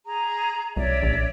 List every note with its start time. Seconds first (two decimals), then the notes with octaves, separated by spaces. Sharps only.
0.06 G#4 A#5
0.77 C2 C#5 D5 E5
1.03 A#1